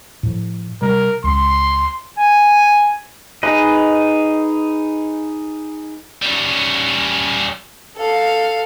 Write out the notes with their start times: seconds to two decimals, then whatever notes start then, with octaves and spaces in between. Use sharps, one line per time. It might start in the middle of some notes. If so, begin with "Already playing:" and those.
0.23 A2 F3
0.82 C3 G3 A#4
1.24 C#2 C6
2.18 G#5
3.43 D#4 G#4 B4 D#5
6.22 G3 C#4
7.96 A4 F5